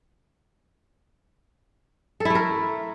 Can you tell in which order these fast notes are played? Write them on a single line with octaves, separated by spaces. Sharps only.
A4 E4 A3 A#4